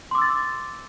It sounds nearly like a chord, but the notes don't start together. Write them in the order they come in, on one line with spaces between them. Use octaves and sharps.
C6 D6 E6 A6